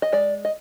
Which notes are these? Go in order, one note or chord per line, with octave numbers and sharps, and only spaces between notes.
D#5
G#3 D5
D#5